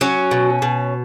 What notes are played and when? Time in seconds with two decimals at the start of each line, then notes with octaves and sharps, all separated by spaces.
0.01 F#3 C#4
0.31 B2
0.62 B2